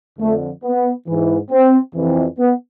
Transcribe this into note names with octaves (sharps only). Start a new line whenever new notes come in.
F2 D3 A3
B3
G#2 E3
C4
F2 C3 E3
B3